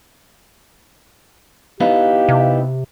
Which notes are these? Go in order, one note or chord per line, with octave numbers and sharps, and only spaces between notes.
B3 D#4 E4 G4 F5
C3